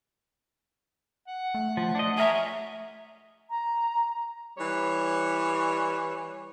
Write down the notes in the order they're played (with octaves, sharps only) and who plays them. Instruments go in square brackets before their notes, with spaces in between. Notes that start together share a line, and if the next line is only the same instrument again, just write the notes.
[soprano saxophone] F#5
[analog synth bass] A3
[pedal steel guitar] F3
D4 D#5
[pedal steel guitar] G#4 A#4 C#5 [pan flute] E5
[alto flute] A#5
[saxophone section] E3 G3 C#5